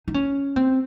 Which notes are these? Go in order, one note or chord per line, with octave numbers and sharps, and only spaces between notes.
D#4
C#4
C4